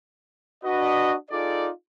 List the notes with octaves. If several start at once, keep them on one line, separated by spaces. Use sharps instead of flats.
D4 F#4 B4 D#5
D#4 F4 G#4 A4 D5